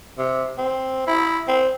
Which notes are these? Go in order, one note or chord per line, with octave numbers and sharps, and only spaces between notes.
C3
C4
E4
C4